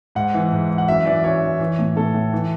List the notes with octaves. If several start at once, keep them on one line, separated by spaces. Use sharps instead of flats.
G#2 F#5
E3
G#2
E3
F#5
F#2 E5
E3 D5
F#2 C#5
E3
E3
A2
A2 A4
A2
E3